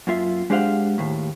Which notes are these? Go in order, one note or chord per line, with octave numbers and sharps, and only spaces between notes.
F#2 A#3 F4 E5
G#3 D4 G4 C5 F5 F#5
D#2 A2